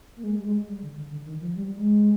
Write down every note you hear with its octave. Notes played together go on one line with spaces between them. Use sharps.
A#3
G#3
G3
G#3
G3
D3
D3
D3
D#3
F3
G3
G#3